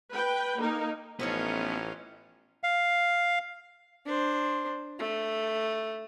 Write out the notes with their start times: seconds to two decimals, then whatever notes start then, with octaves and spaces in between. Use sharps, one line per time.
0.11 B4 G5
0.58 A#3 D#4 A#4
1.20 A1 F3 A3 B3 C#4 D#4 F4
2.64 F5
4.06 D4 C5
4.99 A3